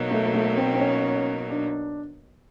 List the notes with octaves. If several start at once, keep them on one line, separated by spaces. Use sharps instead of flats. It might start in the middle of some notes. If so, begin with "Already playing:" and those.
Already playing: B2 F#3 A#3 D#4
A3
A3
C4
C4
C#4
D4